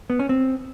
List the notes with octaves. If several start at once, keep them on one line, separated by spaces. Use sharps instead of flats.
B3
C#4
C4